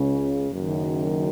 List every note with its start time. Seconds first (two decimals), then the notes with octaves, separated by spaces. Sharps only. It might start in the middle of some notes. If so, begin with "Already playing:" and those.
Already playing: C#2 C#3
0.52 F#1 F#2 D#3